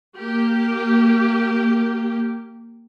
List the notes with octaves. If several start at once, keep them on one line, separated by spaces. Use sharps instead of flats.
A#3 G4